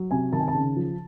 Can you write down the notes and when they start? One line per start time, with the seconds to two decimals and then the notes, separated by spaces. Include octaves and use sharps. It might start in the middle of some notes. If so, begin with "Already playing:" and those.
Already playing: F#3
0.11 C3 G#5
0.32 D#3 A5
0.40 G#5
0.48 A5
0.55 C#3
0.77 F3